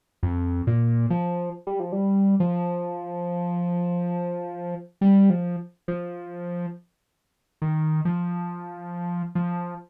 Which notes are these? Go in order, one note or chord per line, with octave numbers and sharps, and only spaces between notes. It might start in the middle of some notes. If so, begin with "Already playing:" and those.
F2
A#2
F3
G3
F3
G3
F3
G3
F3
F3
D#3
F3
F3